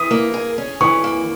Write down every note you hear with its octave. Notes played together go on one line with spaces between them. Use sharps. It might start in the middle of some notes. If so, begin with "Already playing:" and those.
Already playing: E3 D#6
A#3
G#4
C#4
E3 C#6
A#3